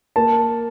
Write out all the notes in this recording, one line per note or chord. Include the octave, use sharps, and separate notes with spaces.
A#3 A5